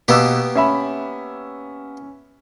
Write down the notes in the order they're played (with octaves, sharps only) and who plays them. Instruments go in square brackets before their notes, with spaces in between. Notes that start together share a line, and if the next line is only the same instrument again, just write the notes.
[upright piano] B2 E6 [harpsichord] A#3 B3 G4
[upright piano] C#4 E5 B5